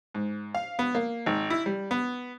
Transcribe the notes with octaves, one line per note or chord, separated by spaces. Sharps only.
G#2
F5
B3
A#3
G#1
E4
G3
B3